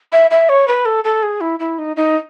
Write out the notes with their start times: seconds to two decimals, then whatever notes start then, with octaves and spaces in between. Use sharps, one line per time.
0.12 E5
0.31 E5
0.49 C#5
0.68 B4
0.85 A4
1.04 A4
1.23 G#4
1.41 E4
1.60 E4
1.78 D#4
1.96 D#4